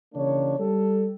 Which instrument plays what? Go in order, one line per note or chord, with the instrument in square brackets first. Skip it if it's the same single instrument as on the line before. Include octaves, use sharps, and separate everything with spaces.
[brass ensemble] C#3 E3 A#3 D4 C#5
G3 A4